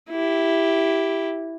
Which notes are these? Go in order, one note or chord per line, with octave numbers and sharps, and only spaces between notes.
E4 G4